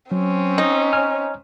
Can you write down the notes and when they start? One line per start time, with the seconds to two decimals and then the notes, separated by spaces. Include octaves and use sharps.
0.12 F#3 C4 C#4
0.58 D#4
0.93 C#5 G#5 F6